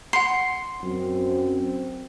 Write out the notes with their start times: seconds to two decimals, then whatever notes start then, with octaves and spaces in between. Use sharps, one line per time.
0.13 F#5 C6 C7
0.83 F#2 C4